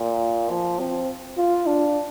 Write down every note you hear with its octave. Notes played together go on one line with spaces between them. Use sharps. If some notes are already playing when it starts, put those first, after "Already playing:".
Already playing: A#2
F3
C4
F4
D4